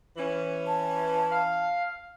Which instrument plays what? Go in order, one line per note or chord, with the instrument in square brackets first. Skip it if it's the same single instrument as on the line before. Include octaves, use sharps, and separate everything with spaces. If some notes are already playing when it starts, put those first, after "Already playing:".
[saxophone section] E3 C#4
[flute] A5
[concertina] F5